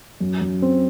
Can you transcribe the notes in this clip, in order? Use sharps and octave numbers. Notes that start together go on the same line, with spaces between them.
F#2
F#2
C4